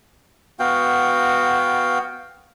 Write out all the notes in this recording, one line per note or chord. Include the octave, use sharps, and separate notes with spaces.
B3 F#4 F5 G5